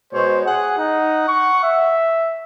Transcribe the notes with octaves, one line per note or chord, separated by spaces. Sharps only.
B2 G#3 C5 C#5
G#4 F#5
D#4
C#6
E5